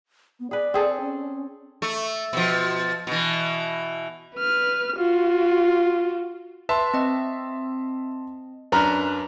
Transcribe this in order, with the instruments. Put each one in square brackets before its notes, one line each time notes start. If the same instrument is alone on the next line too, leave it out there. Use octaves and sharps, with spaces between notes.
[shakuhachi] B3
[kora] G#4 B4 [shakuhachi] D5
[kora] C4 G#4 A4
[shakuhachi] C#4
[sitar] A3
B2 F3
B2 E3
[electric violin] B4 F6
F4 F#4
[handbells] B4 [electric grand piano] E5 [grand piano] A5 C6
[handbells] C4 D#5
[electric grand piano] F#2 D4 [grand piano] B4 A#5 F6